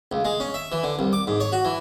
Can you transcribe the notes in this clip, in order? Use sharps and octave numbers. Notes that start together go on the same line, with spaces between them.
C#2
G#3
C#4
E5
E3
D3
C2
D6
G#2
C#5
F#4
E3